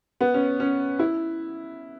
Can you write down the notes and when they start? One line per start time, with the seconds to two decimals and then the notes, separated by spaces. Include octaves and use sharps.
0.21 B3
0.34 C#4
0.60 C#4
0.99 E4